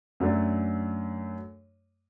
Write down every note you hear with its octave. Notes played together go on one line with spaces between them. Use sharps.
F#2 F#3 A3 D4